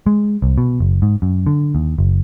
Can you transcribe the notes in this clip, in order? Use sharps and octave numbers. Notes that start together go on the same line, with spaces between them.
G#3
C2
B2
F#1
G#2
F#2
D3
D#2
F#1